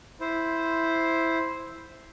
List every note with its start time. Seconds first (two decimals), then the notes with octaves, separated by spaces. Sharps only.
0.21 E4 C5